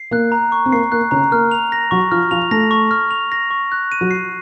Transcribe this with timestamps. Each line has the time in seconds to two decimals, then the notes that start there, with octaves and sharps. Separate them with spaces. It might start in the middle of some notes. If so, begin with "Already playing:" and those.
Already playing: C7
0.11 A#3 F#6
0.32 A#5
0.52 C#6
0.66 C4
0.72 A#3 C7
0.92 A#3 F#6
1.11 C#3 C#4 A#5
1.31 A#3 A#4 F6
1.51 F7
1.72 A#6
1.91 F#3 F#4 C#6
2.11 F3 F4 F6
2.31 F3 F4 F7
2.51 A3 A4 A#6
2.71 C#6
2.91 F6
3.11 F7
3.32 A#6
3.50 C#6
3.72 F#6
3.92 D#7
4.01 F#3 F#4
4.11 C7